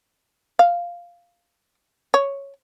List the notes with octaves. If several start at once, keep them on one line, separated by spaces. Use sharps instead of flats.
F5
C#5